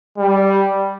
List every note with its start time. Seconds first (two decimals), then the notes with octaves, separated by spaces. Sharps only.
0.18 G3